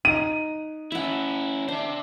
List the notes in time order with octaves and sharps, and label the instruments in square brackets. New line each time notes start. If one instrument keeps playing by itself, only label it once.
[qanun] D#4 [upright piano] D#7
[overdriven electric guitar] C#4 E4 [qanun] E5 F#5
[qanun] D4 [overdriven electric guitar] C5 E5